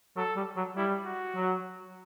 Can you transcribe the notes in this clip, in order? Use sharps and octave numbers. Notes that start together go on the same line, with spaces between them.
F#3 A4
G3
F#3
G3 E4
F#4
F#3